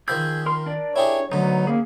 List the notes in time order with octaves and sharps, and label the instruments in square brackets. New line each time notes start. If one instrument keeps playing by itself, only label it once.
[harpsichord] D#3 F3 B5 [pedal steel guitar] G#4 E6 G6
[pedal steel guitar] A#4 C6
D4 A#4 D5
[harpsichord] E4 G4 G#4 [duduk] C#5
[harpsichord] D2 D3 [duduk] F#3 [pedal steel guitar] B3 D#4
[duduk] A#3 [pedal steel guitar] C#4 G#4